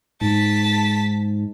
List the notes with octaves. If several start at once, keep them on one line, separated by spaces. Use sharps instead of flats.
G#2 A5 B6